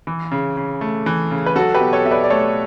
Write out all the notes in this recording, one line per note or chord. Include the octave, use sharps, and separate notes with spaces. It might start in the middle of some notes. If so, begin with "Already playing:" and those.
E3
C#3
C#3
A3
E3
C#3
B4
F#3 F#4 A4
G4 B4
B2
A4 C#5
B2 E5
B4 D5
D5
A3 A4 C#5